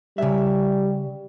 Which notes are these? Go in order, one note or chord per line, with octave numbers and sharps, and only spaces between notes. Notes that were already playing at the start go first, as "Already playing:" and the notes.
C#3 G3 E5